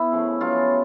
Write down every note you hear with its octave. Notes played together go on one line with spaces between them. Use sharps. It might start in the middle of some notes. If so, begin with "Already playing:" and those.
Already playing: B3 E4
C#3 F3 A3
C#3 F#3 B3 F4